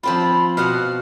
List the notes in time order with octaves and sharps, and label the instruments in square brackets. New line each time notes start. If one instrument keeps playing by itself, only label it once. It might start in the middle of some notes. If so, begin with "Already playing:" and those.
[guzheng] F3 C4 F4 [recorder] B5
[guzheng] B2 F5 F#5 [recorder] F6